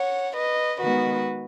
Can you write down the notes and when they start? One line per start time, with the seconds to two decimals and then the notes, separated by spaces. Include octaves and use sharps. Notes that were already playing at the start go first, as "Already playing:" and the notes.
Already playing: C#5 F#5
0.37 B4 D#5
0.80 D#3 G#3 B3 F#4 B4